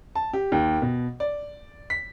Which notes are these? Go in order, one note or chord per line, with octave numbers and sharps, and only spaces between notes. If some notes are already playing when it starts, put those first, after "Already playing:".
A5
G4
D#2
B2
D5
B6